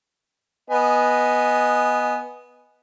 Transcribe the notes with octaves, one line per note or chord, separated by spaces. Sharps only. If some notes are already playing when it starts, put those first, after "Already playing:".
B3 D#5 G#5